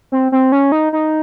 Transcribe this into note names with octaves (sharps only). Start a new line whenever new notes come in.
C4
C4
C#4
D#4
D#4